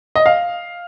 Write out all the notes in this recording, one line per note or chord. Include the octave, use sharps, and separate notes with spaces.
D#5
F5